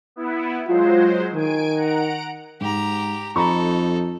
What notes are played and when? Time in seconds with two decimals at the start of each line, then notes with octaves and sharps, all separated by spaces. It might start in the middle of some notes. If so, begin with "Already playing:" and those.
0.16 B3 E4
0.68 F#3 G#3 F4 C5
1.34 D#3 G#5 D7
1.75 F#5 A#5 D7
2.61 G#2 G4 A#5
3.36 F2 D#4 A4 A#5 B5 C#6